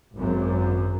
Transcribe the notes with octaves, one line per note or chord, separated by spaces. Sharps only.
G#1 F#2